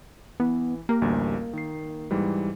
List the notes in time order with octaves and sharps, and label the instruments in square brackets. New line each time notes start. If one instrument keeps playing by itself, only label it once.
[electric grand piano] E3 [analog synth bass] B3
[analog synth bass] A#3 [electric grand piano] G4 A#4
[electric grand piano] A1 D2 G3
D#3 C7
G#2 E3 G3